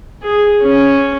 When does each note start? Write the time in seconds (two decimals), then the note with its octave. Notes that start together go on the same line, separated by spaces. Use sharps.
0.23 G#4
0.62 C#4